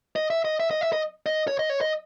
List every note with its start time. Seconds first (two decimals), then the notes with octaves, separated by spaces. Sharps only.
0.16 D#5
0.30 E5
0.45 D#5
0.60 E5
0.71 D#5
0.81 E5
0.93 D#5
1.26 D#5
1.48 C#5
1.59 D#5
1.70 C#5
1.81 D#5